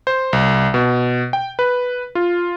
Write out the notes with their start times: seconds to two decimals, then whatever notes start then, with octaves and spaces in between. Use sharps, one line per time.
0.07 C5
0.33 C2
0.74 B2
1.33 G5
1.59 B4
2.15 F4